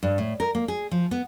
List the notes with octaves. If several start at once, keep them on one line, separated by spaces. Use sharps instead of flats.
G2
A2
A#4
A#3
G#4
F3
B3